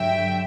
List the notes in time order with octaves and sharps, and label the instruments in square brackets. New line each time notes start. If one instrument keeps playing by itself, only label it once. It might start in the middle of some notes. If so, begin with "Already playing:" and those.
Already playing: [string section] G2 D3 F#3 E5 G5